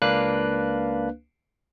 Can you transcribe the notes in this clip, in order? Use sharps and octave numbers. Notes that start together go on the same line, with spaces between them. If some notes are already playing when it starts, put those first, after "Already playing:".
C#2 A#3 D4 B4 F5 F#6